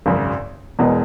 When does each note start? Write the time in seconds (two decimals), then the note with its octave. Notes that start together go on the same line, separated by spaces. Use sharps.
0.06 G#1 F#2 C#3
0.79 E1 E2 B2 G#3